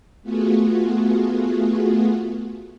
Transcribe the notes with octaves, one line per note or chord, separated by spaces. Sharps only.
A3 B3 F4 F#4 G#4